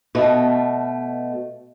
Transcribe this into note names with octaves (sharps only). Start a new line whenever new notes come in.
B2 A3